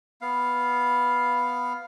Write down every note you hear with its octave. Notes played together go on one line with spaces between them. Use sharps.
B3 F5